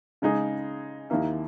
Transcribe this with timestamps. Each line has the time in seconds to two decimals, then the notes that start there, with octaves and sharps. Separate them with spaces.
0.22 C#3 G#3 D#4 G#4
1.10 D#2 D#3 A#3 E4